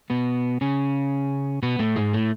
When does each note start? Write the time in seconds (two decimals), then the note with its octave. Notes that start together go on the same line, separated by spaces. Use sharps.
0.10 B2 B3
0.61 C#3 C#4
1.63 B2 B3
1.79 A2 A3
1.96 G#2 G#3
2.13 A2 A3